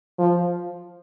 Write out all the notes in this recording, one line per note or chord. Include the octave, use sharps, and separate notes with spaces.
F3